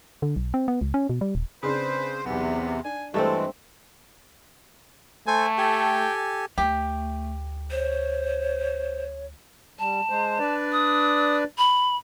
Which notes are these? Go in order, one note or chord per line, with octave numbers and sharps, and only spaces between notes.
D3
B1
C4
B3
C#2
C#4
B2
G3
D#1
C#3 C4 D4 B4 C5
B1 E2 C3 B3
D4 G#5
G2 E3 G#3 A3 C4 A4
A3 A4 C5 G#5
G4 A4 G5 G#5
D2 A3 G4
C5 C#5
G3 A5
G#3 C5
D4 B4 D5
D#6
B5